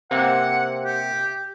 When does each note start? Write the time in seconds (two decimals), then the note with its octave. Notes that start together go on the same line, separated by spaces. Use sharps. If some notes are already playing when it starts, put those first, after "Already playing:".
0.11 C3 A#3 C4 F#5
0.85 G4